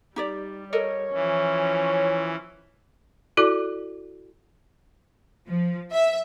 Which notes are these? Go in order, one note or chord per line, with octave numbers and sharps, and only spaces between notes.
G3 D#4 G4 D5
A4 A#4 C#5 D#5
E3 F3 C#4
E4 F#4 A4 D5
F3
E5